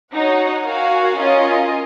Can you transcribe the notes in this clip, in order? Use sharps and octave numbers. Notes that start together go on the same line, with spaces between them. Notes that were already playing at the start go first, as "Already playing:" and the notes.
D#4 F#4 C#5 F#5
F#4 A#4 F5 G#5
C#4 F4 A#4 D#5 G#5